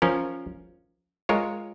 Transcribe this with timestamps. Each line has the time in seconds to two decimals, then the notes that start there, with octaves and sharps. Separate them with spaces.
0.02 F3 C#4 A#4
1.29 G#3 F4 A#4 C#5